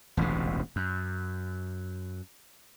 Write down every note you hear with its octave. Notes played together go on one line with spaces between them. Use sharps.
E1 A1 D2 C3
F#2